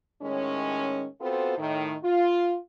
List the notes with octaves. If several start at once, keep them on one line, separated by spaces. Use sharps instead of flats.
A2 D#3 G#3 C#4
B3 C4 F4 F#4 A4 C5
A2 D#3
F4